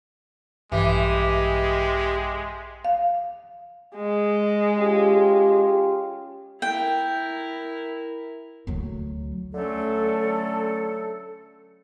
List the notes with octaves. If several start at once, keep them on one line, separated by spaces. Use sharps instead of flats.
A#1 G2 E3 G#3 G4
F5
G#3
C#4 F4 G4
E4 A#4 G5
D2 F#3
D3 F#3 A3 C#4 A4